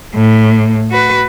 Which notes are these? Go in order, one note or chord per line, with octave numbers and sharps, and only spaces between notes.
A2
F#4 B4